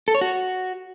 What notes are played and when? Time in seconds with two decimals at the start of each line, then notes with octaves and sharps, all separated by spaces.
0.08 A4
0.15 C#5
0.21 F#4